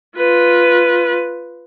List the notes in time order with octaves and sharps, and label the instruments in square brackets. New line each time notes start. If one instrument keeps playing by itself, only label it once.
[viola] F4 B4